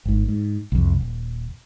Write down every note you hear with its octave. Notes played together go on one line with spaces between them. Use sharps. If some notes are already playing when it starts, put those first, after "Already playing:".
G#1 G#2
G#2
C2 F2
D#1